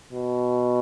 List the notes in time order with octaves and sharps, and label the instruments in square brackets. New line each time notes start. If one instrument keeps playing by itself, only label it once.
[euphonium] B2